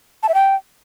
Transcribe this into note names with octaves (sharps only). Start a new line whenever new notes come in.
A5
E5
G5